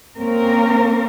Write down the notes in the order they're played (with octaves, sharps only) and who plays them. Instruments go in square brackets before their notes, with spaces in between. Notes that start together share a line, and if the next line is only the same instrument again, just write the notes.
[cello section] A#3 C4 C#4 A#4